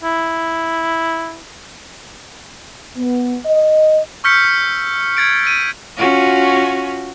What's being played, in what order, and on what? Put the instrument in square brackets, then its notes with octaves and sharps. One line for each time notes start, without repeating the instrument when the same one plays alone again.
[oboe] E4
[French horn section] B3
D#5
[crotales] C#6 E6 F6 G6 B6 C#7
G#6 A6 D7
E6 B6 D#7
[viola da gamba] C#4 F4 F#4